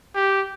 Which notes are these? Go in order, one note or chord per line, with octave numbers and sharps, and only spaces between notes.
G4